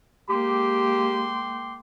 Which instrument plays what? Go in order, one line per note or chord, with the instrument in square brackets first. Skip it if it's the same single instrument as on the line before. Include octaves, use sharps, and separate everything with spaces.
[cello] G#3 A#3 [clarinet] G4 [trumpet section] G5 C6 D6